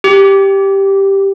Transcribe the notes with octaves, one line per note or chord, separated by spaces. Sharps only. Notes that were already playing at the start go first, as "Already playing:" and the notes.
G4